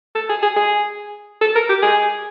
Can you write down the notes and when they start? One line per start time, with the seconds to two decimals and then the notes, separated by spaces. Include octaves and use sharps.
0.15 A4
0.29 G#4
0.42 G#4
0.56 G#4
1.41 A4
1.55 A#4
1.69 G4
1.82 G#4